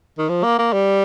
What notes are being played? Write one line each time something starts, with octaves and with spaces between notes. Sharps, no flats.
D#3
F3
A#3
A#3
G3